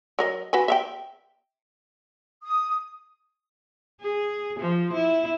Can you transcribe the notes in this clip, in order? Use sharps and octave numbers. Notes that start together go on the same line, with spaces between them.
F#3 A#4 D#5
F#4 B4 G#5
E5 F5 G5
D#6
G#4
F3
E4